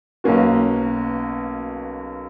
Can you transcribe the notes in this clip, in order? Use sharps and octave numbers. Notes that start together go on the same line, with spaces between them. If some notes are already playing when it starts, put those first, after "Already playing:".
B1 B2 A#3 C#4 F#4